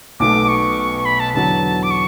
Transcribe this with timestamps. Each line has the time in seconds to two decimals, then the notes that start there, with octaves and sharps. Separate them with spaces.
0.20 B1 B2 A3 D6
0.48 C#6
1.05 B5
1.20 A5
1.34 E2 D3 F#3 A5
1.83 D6
1.91 C#6